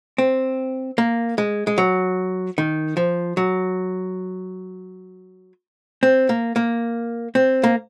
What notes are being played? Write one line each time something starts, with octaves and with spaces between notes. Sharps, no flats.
C4
A#3
G#3
G#3
F#3
D#3
F3
F#3
C4
A#3
A#3
C4
A#3